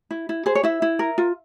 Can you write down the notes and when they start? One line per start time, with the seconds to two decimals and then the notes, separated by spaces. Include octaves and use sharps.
0.11 E4
0.29 E4
0.46 G#4 C5
0.55 C#5
0.63 E4 E5
0.82 E4
0.99 A#4
1.18 F4